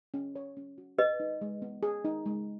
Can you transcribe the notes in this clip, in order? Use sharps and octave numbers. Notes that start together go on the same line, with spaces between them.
C#4
C#5
C#4
F#4
G#4 B4 D#5
D#4
G#3
B3
G#4
D#4
G#3